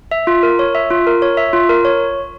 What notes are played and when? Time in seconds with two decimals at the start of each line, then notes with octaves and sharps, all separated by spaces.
0.11 E5
0.27 F4
0.43 A#4
0.59 C#5
0.75 E5
0.90 F4
1.07 A#4
1.22 C#5
1.37 E5
1.53 F4
1.69 A#4
1.85 C#5